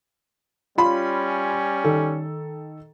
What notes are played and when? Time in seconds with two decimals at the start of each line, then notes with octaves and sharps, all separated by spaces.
0.78 G3 C#4 F4 B5
1.84 D#3 A4